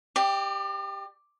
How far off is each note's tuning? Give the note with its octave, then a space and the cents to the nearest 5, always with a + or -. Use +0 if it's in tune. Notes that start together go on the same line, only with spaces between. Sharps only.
G4 +5 D5 +40